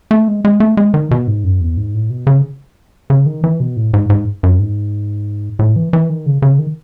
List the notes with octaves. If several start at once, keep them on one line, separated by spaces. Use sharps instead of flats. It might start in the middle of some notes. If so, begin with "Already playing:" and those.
A3
G#3
G#3
A3
G#3
D#3
B2
G#2
F#2
E2
G#2
A2
B2
C#3
C#3
D#3
E3
B2
A2
G#2
G#2
F#2
G#2
A2
E3
E3
D#3
C#3
C#3
D#3